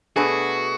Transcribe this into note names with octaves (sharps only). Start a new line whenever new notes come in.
B2 A3 D4 F#4 G#4 B4